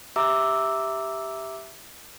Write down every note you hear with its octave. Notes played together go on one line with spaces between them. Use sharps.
G4 E5 A#5 D6 E6